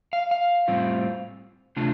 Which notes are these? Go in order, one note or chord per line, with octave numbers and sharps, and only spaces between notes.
F5
F5
A2 G3 C4 F4
C3 A3 D4 F4